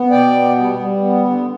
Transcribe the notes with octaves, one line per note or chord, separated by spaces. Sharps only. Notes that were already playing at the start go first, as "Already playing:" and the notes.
Already playing: B3
B2 D5 G5
B3
G3
G3
B3
D3